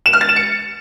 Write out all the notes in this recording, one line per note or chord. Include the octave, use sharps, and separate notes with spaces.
E7
F6
A6
E7
C#7